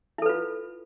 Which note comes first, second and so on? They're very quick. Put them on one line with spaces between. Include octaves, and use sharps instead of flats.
E4 A4 B4 F4